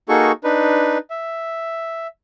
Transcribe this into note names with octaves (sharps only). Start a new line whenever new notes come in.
A#3 D#4 F#4 G#4 A4 C#6
D4 D#4 B4
E5